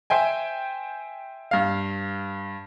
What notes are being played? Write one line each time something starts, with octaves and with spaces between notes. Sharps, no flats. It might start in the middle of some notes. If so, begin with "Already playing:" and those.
C5 E5 G5 G#5
G2 F5